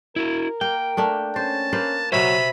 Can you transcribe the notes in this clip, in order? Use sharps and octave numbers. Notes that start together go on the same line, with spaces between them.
E4 F#4 A#4
A#3 G5
A3 A#3 D4
C#4 C5 A5
A#3 B4 C5
B2 F#3 C5 C#5 E5 B5